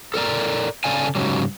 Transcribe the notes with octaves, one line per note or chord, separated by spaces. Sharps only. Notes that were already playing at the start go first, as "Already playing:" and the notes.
A4 A#4 D5 A#5
C#3 A4 D5 F5 G#5
G#2 C#3 F#3 G3